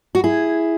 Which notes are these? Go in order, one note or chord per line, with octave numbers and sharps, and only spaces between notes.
F#4
E4 G#4